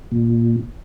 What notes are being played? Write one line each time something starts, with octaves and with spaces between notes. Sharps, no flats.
A#2